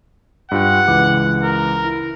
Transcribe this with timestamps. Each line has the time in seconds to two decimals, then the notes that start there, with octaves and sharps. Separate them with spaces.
0.51 G2 F4 F#5 G5
0.88 C#2 E3 D6
1.43 A#4
1.84 E4